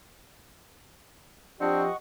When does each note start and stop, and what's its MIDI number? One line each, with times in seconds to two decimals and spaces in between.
1.61 1.89 53
1.61 1.85 60
1.61 1.85 62
1.61 1.89 67
1.61 1.96 75
1.61 1.96 78
1.61 1.96 85